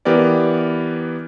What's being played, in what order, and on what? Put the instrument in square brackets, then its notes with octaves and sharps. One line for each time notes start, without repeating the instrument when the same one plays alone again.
[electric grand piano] E3 B3 G4 A#4 D5